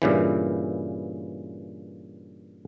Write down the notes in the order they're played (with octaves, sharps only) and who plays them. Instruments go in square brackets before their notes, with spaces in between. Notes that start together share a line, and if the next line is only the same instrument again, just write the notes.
[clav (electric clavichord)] G2 A#2 C#3 E3